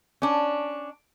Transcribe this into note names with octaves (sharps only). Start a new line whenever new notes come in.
C#4 D4